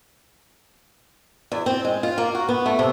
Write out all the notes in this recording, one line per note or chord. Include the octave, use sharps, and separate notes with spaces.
E2
C4
G#3
F4
A#3
F#4
B3
A3
C3